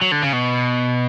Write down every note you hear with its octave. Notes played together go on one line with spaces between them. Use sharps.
F#3
D3
C#3
B2